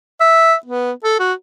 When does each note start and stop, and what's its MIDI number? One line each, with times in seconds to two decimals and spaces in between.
0.20 0.54 76
0.66 0.91 59
1.04 1.18 69
1.19 1.33 66